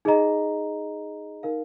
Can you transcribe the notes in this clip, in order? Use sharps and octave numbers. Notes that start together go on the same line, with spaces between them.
D#4 G#4 D#5 A#5
D#4 A#4 F5